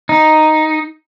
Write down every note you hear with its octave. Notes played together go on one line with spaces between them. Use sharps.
D#4